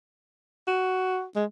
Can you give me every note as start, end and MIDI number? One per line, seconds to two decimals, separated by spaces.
0.67 1.23 66
1.36 1.45 56